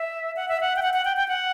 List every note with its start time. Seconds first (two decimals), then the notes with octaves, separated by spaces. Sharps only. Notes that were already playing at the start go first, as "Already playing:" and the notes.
Already playing: E5
0.36 F#5
0.48 E5
0.61 F#5
0.76 G5
0.82 F#5
0.93 F#5
1.05 G5
1.17 G5
1.28 F#5